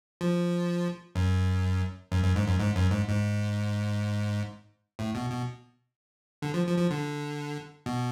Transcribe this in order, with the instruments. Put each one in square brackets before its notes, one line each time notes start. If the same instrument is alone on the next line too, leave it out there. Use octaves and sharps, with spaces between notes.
[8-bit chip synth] F3
F#2
F#2
F#2
G#2
F#2
G#2
F#2
G#2
G#2
A2
B2
B2
D3
F3
F3
F3
D3
B2